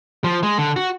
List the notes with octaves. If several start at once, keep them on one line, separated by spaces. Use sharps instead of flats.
F3
G#3
D3
F#4